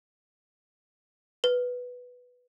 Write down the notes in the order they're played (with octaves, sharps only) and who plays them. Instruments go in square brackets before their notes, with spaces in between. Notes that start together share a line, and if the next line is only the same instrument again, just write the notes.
[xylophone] B4